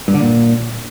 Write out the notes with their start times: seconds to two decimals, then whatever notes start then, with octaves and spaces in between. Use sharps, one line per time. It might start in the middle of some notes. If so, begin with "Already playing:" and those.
0.08 G2
0.14 D3
0.21 A#2